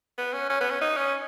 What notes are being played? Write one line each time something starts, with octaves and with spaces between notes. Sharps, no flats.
B3
C#4
C#4
B3
C#4
D#4
C#4